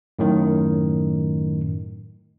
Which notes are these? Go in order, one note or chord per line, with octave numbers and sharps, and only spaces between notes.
F#2 A2 D#3